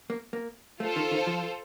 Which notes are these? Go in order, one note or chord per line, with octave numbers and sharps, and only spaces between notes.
A#3
A#3
A3 F4 A4 C5
D#3
D#3
F3